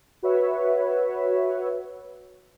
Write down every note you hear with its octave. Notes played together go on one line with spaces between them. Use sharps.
F#4 B4 C#5 E5